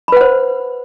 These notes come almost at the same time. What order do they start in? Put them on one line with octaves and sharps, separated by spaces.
B5 B4 F#5 C5